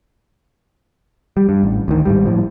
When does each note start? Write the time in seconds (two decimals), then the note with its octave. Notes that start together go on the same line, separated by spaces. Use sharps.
1.37 G3
1.49 G2
1.63 A1
1.88 D2 D#3
2.05 G#1 G#2 G3
2.25 A2 F3